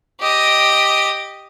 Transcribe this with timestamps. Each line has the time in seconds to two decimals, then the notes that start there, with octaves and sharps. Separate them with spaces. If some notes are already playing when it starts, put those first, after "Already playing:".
0.20 G4 D#5